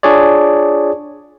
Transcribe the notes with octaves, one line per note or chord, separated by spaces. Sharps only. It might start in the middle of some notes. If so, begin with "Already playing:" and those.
D4 F4 G#4 C#5 D5